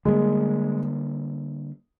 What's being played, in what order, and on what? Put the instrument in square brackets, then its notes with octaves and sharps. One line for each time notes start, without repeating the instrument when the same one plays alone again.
[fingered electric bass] D3 G3 A#3 [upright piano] G#3